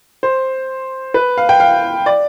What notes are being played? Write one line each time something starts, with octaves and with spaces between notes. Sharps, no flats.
C5
B4
F5
G5
F5
D5